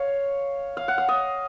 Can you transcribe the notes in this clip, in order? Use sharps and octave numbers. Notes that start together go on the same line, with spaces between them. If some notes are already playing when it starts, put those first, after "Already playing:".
Already playing: C#5 F5
F5
F#5
F5
D#5